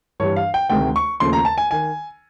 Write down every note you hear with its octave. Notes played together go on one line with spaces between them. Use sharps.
G2 E3 G3 C#5
F5
G5
D2 C3 D#3 G#3 G5
C#6
D#2 C#3 F3 A3 C6
A#5
A5
G#5
D#3 G#5